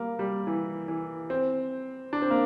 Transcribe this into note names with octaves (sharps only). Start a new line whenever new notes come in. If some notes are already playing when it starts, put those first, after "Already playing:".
Already playing: G3 A#3
G3
E3
E3
C4
D4
C4
A#3